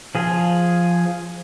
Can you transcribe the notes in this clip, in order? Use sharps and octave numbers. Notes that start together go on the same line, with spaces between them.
F3 G#4